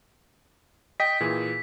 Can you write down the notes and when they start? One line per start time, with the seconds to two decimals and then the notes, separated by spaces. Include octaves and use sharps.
1.00 D#5 G5 B6
1.20 A#2 E3 G#4